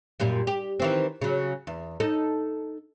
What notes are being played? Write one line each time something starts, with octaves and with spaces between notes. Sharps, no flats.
F#2 A#2 G3
G4
D#3 E3 C4
C#3 F#3
E2
D#4 A4